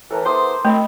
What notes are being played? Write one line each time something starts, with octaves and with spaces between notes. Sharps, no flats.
A2 E3 A4 A#4
E3 B3 C5 C6 D6 D#6
F#2 A3 C4 D#5 B5